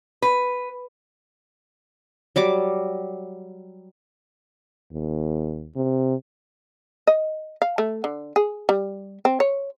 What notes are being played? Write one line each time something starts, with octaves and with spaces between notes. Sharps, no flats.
B4
F#3 G3 D6
D#2
C3
D#5
F5
A3
D3
G#4
G3
C4
C#5